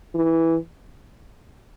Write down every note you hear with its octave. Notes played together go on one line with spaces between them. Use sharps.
E3